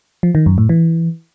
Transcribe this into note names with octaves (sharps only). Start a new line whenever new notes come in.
F3
D#3
F#2
A2
E3